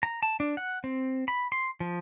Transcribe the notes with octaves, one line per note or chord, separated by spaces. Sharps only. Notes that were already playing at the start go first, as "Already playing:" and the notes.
A#5
A5
D4
F#5
C4
B5
C6
F3